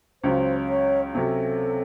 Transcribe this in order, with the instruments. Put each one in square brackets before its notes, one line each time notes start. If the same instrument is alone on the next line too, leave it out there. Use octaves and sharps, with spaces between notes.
[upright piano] C#2 C#3 F#3 [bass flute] C5
[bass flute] C#5
[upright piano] C3 F#3 C#4 [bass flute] A4